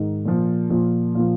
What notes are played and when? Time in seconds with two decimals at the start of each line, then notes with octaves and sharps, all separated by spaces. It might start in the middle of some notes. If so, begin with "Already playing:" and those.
Already playing: G#2 D#3
0.25 A#2 F3
0.70 A#2 F3
1.15 A#2 F3 F4